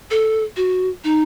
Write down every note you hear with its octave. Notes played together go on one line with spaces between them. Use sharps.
A4
F#4
D#4